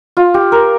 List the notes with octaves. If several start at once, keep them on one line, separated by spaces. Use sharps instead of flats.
F4
G4
A#4